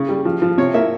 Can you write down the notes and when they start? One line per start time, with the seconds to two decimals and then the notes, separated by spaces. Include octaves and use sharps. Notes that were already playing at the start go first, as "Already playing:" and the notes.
Already playing: C#3
0.09 G3
0.25 F3
0.42 F3
0.58 C3 C#5
0.74 A#3 E5